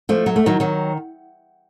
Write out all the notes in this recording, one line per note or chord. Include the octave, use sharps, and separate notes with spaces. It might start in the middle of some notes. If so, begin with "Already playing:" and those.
F3 A3
F#3
A3
D#3 F#3
D#3 F#3